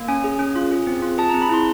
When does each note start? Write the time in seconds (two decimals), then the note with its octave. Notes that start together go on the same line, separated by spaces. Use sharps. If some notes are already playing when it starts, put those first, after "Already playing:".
Already playing: A#3
0.08 C#4 G#5
0.24 G#4
0.39 C#4
0.56 F4
0.72 G#4
0.87 C4
1.02 F4
1.18 G#4 A5
1.29 A#5
1.34 C4
1.42 B5
1.49 E4 C6